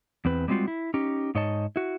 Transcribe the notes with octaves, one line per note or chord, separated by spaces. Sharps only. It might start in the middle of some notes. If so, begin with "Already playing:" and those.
E2 C4 B4
G3 G#3 C4 D#4 F4 F#4
E4
C#4 D#4 G4
G#2 D#4 C#5 D#5 A5
E4 F#4